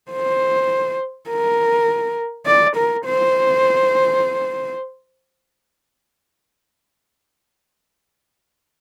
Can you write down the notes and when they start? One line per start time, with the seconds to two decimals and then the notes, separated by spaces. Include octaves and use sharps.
0.11 C5
1.29 A#4
2.47 D5
2.76 A#4
3.06 C5